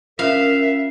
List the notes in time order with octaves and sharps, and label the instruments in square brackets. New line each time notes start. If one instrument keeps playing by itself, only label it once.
[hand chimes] C#4 F4 [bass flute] A#4 [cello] E5 [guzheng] F5